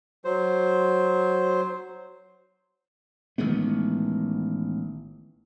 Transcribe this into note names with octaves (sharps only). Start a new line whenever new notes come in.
F#3 C5
A1 D#3 G#3 B3